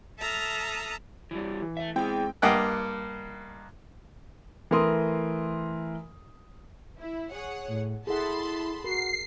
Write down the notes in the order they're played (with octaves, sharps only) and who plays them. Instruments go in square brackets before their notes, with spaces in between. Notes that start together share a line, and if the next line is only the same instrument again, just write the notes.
[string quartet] A4 E5 A5 A#5 D#6 F6
[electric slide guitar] E3 G3
[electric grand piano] E3
[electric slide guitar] A3 E5
[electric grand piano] G#3 C4 G5 [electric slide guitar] E4 G#4
[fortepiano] G2 A#3 D#5 F#5 G5 F#6
[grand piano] E3 A3 A#4 C6 D#6
[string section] E4
G#4 C#5 F#5
[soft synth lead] A2
[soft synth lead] E4 [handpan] G#4 A4 F#5 [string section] A5 B5 C6
[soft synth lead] F#4 [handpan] A#4 [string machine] C7